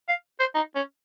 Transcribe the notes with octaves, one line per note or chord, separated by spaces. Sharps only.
F5
C5
D#4
C#4